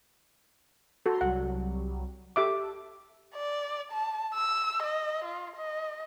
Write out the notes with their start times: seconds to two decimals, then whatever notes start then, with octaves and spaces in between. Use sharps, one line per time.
1.06 F#4 A4 A#5 C6
1.21 C2 F#3 G3 F#5
2.36 G4 A4 E5 D6
3.34 D5
3.92 A5
4.34 E6
4.83 D#5
5.24 F4
5.56 D#5